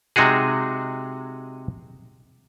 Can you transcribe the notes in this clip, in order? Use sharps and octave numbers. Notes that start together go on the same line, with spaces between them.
C3 G#3 D#4 F#4 G#4